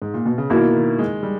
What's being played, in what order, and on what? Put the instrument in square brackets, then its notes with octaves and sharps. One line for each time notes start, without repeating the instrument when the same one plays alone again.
[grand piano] G#2
A#2
B2
C#3
[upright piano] B2 A#3 E4 [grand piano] D#3
[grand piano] D#3
G#3
G3